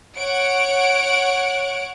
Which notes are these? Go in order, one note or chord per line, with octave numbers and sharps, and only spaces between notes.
C#5 F#5 D7